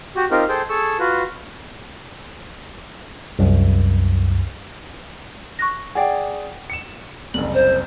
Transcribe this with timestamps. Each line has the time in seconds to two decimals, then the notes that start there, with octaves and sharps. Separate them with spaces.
0.16 F#4 G4
0.31 C4 D#4 F4 G4 A#4
0.49 G#4 A4 C5 G5
0.70 G#4 A4 C#6 E6
0.99 F4 F#4 B4
3.39 C2 F#2
5.59 C#6 F#6 A#6
5.95 G#4 D5 F#5 G5
6.70 C#7 E7
7.34 F#1 C2 F#7
7.54 C5